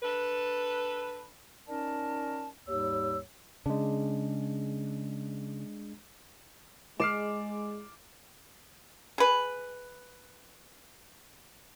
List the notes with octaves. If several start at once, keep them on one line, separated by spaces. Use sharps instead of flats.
D4 A4 B4
C#4 D#4 A#4 D5 A5
D#2 G#2 G3 C#5 E6
C#3 G#3 D4
G#3 D5 D6 F6 C7 E7
G#4 B4